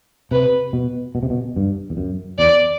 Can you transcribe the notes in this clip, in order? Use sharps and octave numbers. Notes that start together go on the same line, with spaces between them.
C3 B4
B2
B2
C3
B2
G2
E2
F#2
E2 D5